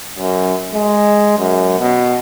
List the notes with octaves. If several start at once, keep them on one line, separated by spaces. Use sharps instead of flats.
F#2
G#3
F#2
B2